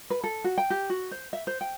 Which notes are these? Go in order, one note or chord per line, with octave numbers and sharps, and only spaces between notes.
B4
A4
F#4
G5
G4
F#4
C5
E5
C5
G5